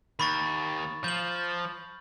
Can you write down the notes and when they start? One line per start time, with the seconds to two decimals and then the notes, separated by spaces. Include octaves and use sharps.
0.20 D#2 B5 C#6 A6
1.04 F3 G6 F#7